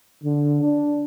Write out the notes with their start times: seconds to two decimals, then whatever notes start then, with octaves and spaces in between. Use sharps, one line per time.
0.23 D3
0.62 D4